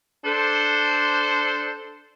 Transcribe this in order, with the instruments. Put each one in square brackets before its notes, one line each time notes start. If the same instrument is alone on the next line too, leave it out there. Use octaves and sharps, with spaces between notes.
[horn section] D4 A4 C5